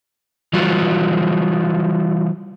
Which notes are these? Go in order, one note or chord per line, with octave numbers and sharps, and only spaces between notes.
E3 G3 F4 F#4